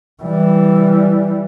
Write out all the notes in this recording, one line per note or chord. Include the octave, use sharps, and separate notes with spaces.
E3 G3